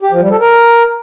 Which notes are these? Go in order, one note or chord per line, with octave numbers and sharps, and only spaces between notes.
G4
F3
G3
A4
A#4